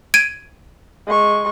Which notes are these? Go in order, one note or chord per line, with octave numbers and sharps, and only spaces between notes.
G#6 D7 D#7
G#3 C#6